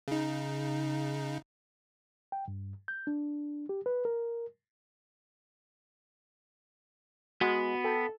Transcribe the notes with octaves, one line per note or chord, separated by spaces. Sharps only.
C#3 D#4
G5
G2
G6
D4
G4
B4
A#4
G#3 B3 F#4
A4 G5 A5